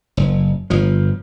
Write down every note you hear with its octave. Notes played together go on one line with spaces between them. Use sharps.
F#1
G1 F3